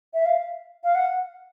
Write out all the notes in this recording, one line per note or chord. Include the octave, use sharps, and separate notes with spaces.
E5
F5
F5
F#5